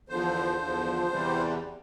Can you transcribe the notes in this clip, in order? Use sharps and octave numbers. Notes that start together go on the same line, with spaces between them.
E2 D3 F3 C5
E2 D3 F3
E2 C3 E3 G3